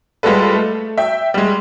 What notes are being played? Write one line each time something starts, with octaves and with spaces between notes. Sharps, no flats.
G3 G#3 F4 A4 B4
A3
E5 G5
G3 G#3